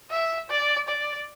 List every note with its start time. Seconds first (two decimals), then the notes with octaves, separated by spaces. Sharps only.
0.11 E5
0.50 D5
0.88 D5